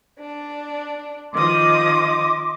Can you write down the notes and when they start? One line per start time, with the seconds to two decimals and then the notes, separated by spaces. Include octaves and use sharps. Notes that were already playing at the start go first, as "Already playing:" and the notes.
0.19 D4
1.33 D#3 F3 D#5 C6 D6 D#6